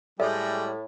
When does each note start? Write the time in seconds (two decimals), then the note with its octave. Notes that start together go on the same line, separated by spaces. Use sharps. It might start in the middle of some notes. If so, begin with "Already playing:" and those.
0.20 A2 G3 G#3 D5 E5